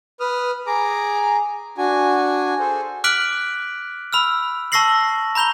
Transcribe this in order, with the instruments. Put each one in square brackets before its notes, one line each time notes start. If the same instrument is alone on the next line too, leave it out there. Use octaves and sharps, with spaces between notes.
[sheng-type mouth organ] B4 D#6 F6
G#4 A#5 D6
D4 F#4 G#5
G#4 A4 C5
[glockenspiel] D6 F6 F#6 B6 D7 F#7
B5 E6 F6
A5 C#6 E6 A#6 C7 F#7
A#5 B5 G6 F7 G7